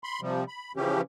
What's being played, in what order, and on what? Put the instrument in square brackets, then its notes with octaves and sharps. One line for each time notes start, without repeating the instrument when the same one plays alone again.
[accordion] B5 C6
C3 F3 G3
B5
C#3 E3 F3 C#4 G4